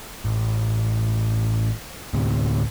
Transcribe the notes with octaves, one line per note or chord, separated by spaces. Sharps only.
A1
D2 A2 C3